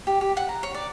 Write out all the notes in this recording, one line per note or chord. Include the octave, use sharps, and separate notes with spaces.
G4
G4
F#5
A#5
C#5
D5